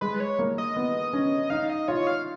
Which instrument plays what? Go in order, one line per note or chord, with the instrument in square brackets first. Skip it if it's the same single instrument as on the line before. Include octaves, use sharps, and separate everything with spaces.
[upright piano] G#3 [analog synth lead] B4
[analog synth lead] C#5
[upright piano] A#3
[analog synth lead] D#5
[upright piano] B3
C#4
[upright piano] D#4 [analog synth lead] F5
[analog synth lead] D#5
[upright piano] F4 [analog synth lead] C#5
[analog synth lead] F5